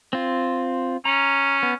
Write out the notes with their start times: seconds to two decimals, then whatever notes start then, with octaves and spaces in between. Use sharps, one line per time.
0.13 C4 F4
1.05 C#4 A#5
1.63 B3